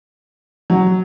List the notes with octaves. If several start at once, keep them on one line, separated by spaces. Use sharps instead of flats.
F#3